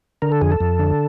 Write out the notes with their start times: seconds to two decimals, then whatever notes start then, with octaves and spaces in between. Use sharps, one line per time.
0.22 D3 A#4
0.32 A4
0.41 F2 G#4
0.52 A4
0.60 F2
0.79 D3